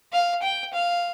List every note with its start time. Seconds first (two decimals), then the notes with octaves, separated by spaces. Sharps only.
0.12 F5
0.42 G5
0.73 F5